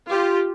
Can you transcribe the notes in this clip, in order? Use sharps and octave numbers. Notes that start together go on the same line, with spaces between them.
F4 G4